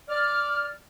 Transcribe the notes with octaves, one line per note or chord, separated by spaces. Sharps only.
D5 F6